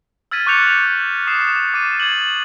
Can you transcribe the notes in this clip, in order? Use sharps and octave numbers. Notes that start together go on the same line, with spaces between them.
E6 F6 G#6 A6 B6 D#7
C#6 D6 F#6 G6 C#7 F7
D6 D#6 C7 E7
D6 A6 D#7
G#6 F#7